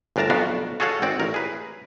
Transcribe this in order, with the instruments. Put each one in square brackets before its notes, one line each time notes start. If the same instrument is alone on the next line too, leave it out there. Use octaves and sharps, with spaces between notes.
[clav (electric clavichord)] G1 D2 D4 A#4 A5 A#5
B1 F2 B3 D4 F#4 F5
F#4 G#4 A4 C#5 F5 F#5
G#1 C4 F#4 D5
A1 A#4
G#4 B4